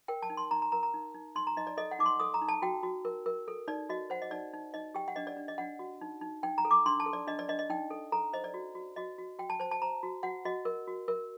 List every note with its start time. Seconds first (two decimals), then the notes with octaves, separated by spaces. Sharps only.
0.08 A#4 G5
0.22 A5
0.30 D#4
0.37 C6
0.51 D#4 A#5
0.62 A#5
0.72 A#4 A#5
0.83 A#5
0.94 D#4
1.15 D#4
1.35 D#4 C6
1.47 A#5
1.57 D#4 D#5
1.67 D5
1.77 A4 D#5
1.91 F#5
1.99 D#4 D6
2.06 C6
2.20 A4 D#6
2.34 A#5
2.42 D#4
2.48 A5
2.62 F#4 G5
2.83 F#4
3.05 A#4
3.26 A#4
3.48 A4
3.68 D#4 D5
3.89 F#4 D#5
4.10 C5 F#5
4.22 D#5
4.31 D#4 D5
4.53 D#4
4.74 D#4 D#5
4.94 G4 G5
5.08 F#5
5.16 D4 D#5
5.27 D5
5.37 D4
5.48 D#5
5.58 D4 F#5
5.79 F#4
6.01 D#4
6.21 D#4
6.43 D#4 G5
6.58 A#5
6.65 A4
6.71 D6
6.86 D4 C6
7.00 A5
7.06 A4
7.13 D5
7.27 D4 D#5
7.39 D5
7.48 D4 D#5
7.59 D#5
7.70 D#4 G5
7.90 A4
8.12 A4 A#5
8.33 C5 D#5
8.44 D5
8.54 F#4
8.75 F#4
8.96 F#4 D#5
9.18 F#4
9.39 F#4 G5
9.50 A5
9.60 C5 A5
9.71 A5
9.82 C5 A#5
10.03 F#4
10.23 F#4 F#5
10.45 F#4 D#5
10.65 A#4
10.87 F#4
11.08 A#4